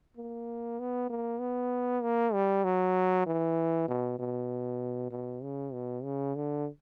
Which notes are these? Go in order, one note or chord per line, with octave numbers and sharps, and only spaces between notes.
A#3
B3
A#3
B3
A#3
G3
F#3
E3
B2
B2
B2
C#3
B2
C#3
D3